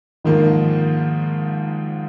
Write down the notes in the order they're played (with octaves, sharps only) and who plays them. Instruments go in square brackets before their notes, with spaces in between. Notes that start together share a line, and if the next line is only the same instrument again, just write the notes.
[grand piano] G#2 F3 A#3 [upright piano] D#3